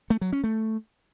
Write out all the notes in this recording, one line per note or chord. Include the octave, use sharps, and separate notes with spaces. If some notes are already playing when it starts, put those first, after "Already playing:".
A3
F#3
C#4
A3